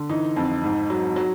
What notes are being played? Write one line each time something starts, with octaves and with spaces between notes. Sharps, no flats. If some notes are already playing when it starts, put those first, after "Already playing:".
Already playing: D3
E3 D#4
F2
G#2
F#3
F#3